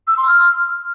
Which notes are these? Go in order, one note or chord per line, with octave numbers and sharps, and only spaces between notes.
E6
C6
F6